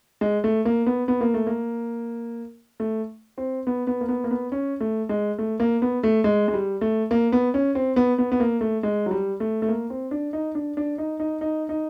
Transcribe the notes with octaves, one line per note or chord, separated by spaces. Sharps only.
G#3
A3
A#3
B3
B3
A#3
A3
A#3
A3
C4
B3
B3
A#3
B3
A#3
B3
C#4
A3
G#3
A3
A#3
B3
A3
G#3
G#3
G3
A3
A#3
B3
C#4
C4
B3
B3
B3
A#3
A3
G#3
F#3
G3
A3
A3
A#3
C4
D4
D#4
D4
D4
D#4
D#4
D#4
D#4